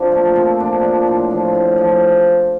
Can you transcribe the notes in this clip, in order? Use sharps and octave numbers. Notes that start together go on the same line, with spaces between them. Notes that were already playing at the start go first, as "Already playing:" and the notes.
Already playing: F3 C4 D4
A#2 A3
F3 C4
A#2 D4
F3
A2
F3
A2
F3